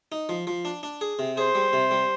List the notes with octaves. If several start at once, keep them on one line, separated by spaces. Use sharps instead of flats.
D#4
F3
F3
D4
D4
G#4
C3
G#4 C5
G3
C3
G3